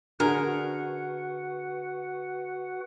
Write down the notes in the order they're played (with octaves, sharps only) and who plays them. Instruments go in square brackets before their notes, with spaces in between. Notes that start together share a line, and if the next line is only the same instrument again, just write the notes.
[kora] D3 G#4 [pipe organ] F#4 B4 F#5 [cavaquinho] A#4